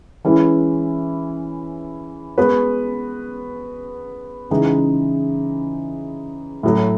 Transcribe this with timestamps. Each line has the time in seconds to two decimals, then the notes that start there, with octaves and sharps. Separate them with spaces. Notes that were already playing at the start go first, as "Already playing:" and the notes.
0.25 E3 G#3 C#4 E4 B4
2.38 G#3 B3 F#4 B4
4.50 C#3 E3 G#3 D#4
6.63 A2 F#3 A3